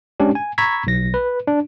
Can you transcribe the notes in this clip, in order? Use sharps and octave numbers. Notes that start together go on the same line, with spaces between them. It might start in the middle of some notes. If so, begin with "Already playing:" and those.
G#3 C#4 D4 G4
G#5
A#5 B5 C#6 E6 G#6 B6
B1 A#6
B4
D4